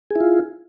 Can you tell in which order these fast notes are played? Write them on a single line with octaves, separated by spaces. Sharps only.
G#4 E4 F4